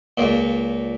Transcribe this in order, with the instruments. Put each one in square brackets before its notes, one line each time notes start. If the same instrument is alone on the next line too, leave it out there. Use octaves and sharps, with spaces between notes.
[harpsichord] C#2 A#2